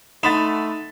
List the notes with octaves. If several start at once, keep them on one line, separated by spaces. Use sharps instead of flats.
A3 D#4 F#5 B5 C6 A6 B6 E7